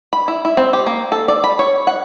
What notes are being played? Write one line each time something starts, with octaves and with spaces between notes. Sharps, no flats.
B5
E4
E4
C4
G4
A#3
A4
D5
B5
C#5
F#5